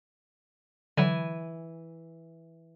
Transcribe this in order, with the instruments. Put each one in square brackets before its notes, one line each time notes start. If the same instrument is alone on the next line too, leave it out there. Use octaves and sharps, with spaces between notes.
[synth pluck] D3 F#3 [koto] E3 G#5